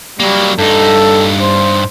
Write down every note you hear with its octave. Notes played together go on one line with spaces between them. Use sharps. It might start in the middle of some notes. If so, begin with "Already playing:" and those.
F#3 G3 A#3
G2 D#4 A4
C5